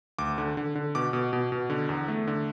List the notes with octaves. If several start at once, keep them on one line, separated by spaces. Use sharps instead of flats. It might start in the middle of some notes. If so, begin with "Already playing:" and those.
D2 D6
D3
D3
D3
B2 D6
B2
B2
B2
D3
E2
A3
D3